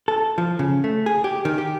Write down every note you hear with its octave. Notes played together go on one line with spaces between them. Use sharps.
A4
F3
C#3
A3
G#4
G4
D#3
G4